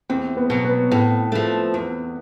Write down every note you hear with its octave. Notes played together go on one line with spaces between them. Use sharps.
E2 C4
B3
B2 F#3
B3
A2 C4
F3 A3
E2